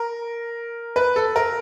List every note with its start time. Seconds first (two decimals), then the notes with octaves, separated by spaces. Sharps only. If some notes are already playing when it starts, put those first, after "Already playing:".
Already playing: A#4
0.96 B4
1.16 A4
1.36 A#4